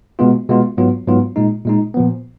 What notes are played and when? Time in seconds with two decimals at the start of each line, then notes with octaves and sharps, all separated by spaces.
0.19 B2 G#3 B3 F4
0.49 B2 G#3 B3 F4
0.77 G#2 F#3 B3 F4
1.07 G#2 F#3 B3 F4
1.36 A#2 G#3 D#4
1.65 A#2 G#3 D#4
1.94 A#2 F3 B3